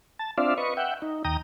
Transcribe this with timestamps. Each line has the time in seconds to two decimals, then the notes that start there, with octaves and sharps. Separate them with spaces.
0.19 A5
0.38 C4 D4 F4 D5 E5 F5
0.58 B4 D#5 C#6
0.77 E5 F#5 G5
1.02 D#4
1.24 D#2 G5 A#5 D#6